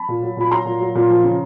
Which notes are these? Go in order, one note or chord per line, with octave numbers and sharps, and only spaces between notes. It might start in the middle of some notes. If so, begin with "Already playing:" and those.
Already playing: A5 B5
A#2
F#3
A#2 B5
F#3 A#5 C6
A#2
F#3
A#2
F3
C#3